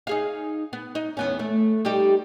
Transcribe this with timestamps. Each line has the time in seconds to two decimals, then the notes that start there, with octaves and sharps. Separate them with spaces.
0.07 D#4 G#4 F5
0.73 B3
0.95 D#4
1.17 E2 B3 C#4
1.39 A3
1.85 G3 D#4 G4